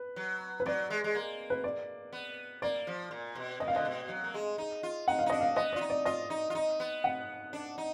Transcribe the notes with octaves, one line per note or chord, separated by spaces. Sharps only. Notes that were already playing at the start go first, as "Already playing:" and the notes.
Already playing: B4
F#3
B4
F#3 D5
G#3
G#3
A#3
B4
D5
B3
A#3 D5
F3
A#2
B2
A#2 D#5
F5
D3 D#5
B2
F#3
A#3
G#3
D#4
F4
D#4 F#5
F5
D#4
D4 D#5
F5
B3 D#5
F4 D5
D#4
D5
F4 D#5
D#4
F4
D#4
B3
F#5
D4
D#4